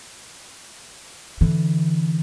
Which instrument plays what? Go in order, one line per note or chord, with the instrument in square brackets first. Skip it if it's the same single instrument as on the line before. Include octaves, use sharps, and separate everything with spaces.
[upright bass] D3 E3